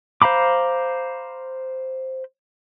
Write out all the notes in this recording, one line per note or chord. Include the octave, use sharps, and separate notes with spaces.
C5 F5 A#5 B5 D6